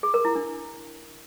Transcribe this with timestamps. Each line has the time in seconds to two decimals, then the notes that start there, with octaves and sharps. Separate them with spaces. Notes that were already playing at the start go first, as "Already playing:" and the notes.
0.03 G#4
0.14 A#4
0.25 E4
0.35 D4